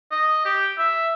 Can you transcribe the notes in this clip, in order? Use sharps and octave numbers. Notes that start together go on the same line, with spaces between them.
D#5
G4
E5